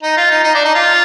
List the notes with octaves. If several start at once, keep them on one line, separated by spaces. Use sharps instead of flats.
D#4
F4
D#4
D#4
D4
D#4
F4